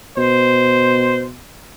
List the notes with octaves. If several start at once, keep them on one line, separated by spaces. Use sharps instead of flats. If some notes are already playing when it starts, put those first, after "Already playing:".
B2 C5